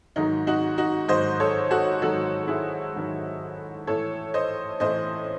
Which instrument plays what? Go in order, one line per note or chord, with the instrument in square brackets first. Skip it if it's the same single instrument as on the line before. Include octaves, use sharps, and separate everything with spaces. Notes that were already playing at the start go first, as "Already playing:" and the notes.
[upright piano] G#2 D#3 F#3 D#4
D#4 F#4
D#4 F#4
G#2 D#3 F#3 C5 D#5
A4 C#5
F#4 A4
G#2 D#3 F#3 F#4 A4
E4 G#4
G#2 D#3 F#3
A2 E3 A4 C#5
C5 D#5
A2 E3 C5 D#5